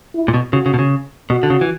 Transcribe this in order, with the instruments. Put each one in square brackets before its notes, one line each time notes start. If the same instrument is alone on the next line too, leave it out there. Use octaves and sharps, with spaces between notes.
[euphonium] E4
[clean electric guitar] A#2
B2
[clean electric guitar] C#3 [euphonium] F#4
[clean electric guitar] C#3
B2
C#3
[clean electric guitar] B2 [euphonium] F#4
[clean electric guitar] D3
C#3
E3